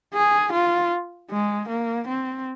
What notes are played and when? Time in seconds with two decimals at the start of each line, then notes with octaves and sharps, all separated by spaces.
0.14 G#4
0.53 F4
1.31 G#3
1.69 A#3
2.08 C4